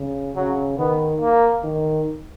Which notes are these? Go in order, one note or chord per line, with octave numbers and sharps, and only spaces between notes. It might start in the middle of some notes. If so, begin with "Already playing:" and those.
Already playing: C#3
C#3 F#3
D#3 B3
A#3
D#3